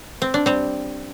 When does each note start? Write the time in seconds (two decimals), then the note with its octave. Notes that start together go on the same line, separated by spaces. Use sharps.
0.22 C4
0.34 D4
0.46 G3 C4